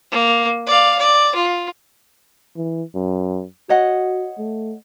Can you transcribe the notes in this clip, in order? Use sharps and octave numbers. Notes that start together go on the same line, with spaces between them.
A#3
D5 F5
D5
F4
E3
F#2
F#4 C#5 D#5 F#5
A3